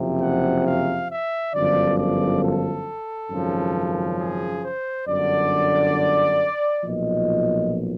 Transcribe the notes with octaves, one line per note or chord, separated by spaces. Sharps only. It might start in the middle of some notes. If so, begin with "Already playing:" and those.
Already playing: F#1 F2 C3 F3
F#5
F5
E5
G1 F#2 D3 F3 D5
D5
A4
G#1 F#2 C#3 F3
G#4
C5
G1 F#2 D3 D5
B1 A#2 F3 D#5